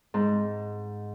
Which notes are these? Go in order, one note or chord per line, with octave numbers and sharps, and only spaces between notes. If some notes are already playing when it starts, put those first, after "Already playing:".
G#2